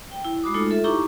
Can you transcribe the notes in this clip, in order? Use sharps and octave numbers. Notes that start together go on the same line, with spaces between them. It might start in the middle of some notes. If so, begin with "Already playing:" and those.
G5
E4
G#3 F#4 B5 D6 D#6
G#3 A3 D#4 F4 A4
F4 A4 E5
D#4 E4 G4 A#5 C#6 D6